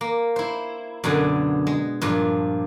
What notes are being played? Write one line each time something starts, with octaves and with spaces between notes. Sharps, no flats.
A#3
E4 C5
F#2 B2 D3 G#5
G#3
G2 A#2 F3